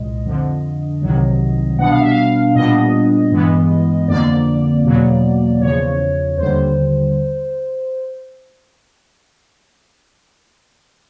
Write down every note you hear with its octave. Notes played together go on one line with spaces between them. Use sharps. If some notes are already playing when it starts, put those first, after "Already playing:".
Already playing: C2 A#2 G#3 D#5
F2 D3 F3
C2 C3 D#3 F#3
B2 G3 B3 D4 F#5
F5
E5
F5
A#2 G3 B3 D4 D#5
G2 E3 G#3 B3
F2 D3 F3 A#3 D5
E2 B2 F#3 A#3
E2 C#3 F3 C#5
D#2 D3 G3 C5